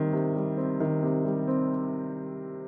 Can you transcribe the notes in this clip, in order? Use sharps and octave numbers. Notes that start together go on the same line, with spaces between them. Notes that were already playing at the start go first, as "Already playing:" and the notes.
Already playing: C3 D#3 G3 C4
C3
G3
C4
D#3
C3
G3
C4